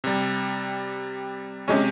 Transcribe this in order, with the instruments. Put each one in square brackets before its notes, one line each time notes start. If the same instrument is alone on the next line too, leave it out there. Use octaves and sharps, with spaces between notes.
[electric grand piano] C3 G3
[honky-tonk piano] C3 G#3 C#4